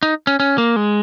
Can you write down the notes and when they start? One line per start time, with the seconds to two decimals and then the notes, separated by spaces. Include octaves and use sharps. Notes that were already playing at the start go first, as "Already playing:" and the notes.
0.03 D#4
0.27 C#4
0.40 C#4
0.58 A#3
0.76 G#3